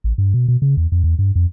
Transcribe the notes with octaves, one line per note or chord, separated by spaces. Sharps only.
A1
G2
B2
B2
C#3
E2
F2
E2
G2
F2